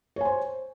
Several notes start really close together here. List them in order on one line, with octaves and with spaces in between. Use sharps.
C#5 G#5 C5